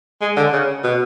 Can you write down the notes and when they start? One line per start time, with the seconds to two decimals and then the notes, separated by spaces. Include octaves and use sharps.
0.21 G#3
0.37 D3
0.53 C#3
0.84 B2